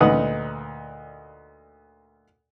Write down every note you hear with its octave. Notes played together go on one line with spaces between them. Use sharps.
D2 A#2 D#4 B4 F#5 D#6